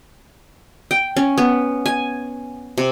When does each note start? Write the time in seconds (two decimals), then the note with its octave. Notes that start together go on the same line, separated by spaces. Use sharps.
0.91 G5
1.17 C#4
1.38 B3
1.86 G#5
2.78 C3